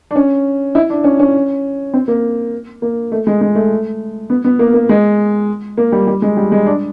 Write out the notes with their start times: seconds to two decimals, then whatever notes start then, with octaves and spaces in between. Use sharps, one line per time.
0.11 D4
0.16 C#4
0.75 E4
0.90 D4
1.04 C#4
1.19 C#4
1.94 C4
2.08 A#3
2.82 A#3
3.12 A3
3.27 G#3
3.41 G#3
3.55 A3
4.30 B3
4.44 B3
4.59 A#3
4.74 A#3
4.89 G#3
5.77 A#3
5.92 G3
6.07 G3
6.22 G#3
6.37 G3
6.52 G#3
6.66 D4